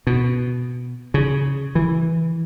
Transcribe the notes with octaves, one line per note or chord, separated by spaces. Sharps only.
B2
C#3
E3